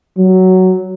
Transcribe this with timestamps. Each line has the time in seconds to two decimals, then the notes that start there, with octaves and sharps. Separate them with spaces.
0.17 F#3